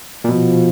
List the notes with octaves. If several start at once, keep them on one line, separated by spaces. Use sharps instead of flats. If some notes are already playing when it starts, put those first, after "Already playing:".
A#2
B2 F3